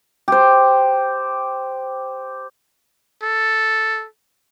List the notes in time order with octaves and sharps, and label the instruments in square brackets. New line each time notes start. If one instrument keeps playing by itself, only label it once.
[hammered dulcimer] G4 C5
[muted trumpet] A4